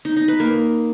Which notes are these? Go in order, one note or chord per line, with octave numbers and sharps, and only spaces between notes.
D#4
D#4
B4
A#3